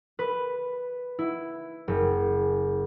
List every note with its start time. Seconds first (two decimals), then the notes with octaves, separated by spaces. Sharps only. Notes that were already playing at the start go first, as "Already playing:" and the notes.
0.19 B4
1.19 E4
1.88 F#1